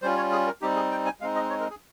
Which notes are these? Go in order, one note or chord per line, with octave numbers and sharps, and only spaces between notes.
G3 C#4 F4 C5
C#5
G#4
A#4
G3 C4 D#4 G4
G#4
G5
G#5
G#3 C4 D#4 F5
D#5
C#5
A#4
G#4